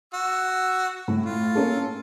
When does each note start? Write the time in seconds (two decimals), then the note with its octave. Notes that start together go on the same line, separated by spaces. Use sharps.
0.14 F#4 E6
1.08 A2
1.26 F4
1.55 A#3 C#4 A4